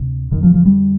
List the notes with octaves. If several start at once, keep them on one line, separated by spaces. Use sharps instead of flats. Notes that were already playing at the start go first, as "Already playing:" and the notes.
Already playing: D2 C3
F2 D3 D#3
F3
F3
G3